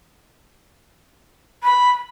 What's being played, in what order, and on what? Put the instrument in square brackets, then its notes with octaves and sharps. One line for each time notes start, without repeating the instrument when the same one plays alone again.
[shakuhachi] B5